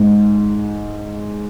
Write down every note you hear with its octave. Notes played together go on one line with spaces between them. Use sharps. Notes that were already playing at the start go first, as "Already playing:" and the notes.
Already playing: G#2